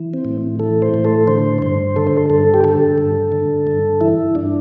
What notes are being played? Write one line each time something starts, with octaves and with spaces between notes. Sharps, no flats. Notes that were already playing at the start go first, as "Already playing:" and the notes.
Already playing: E3
C4
A2
E3 A4
C5
A2
A4
D3 C5
G2 C5
D3 A4
C5
A4
G2 A4
G4
D3 A4
G2
D3
G2
E3 E4
G2 D4